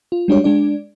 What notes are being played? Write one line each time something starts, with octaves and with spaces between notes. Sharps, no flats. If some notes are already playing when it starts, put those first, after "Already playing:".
F4
G3 G#3 D4 F#4 G4 C#5
G#3 D4 D5